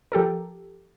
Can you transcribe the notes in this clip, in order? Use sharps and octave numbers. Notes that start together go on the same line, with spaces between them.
F3 G4 A4 A#4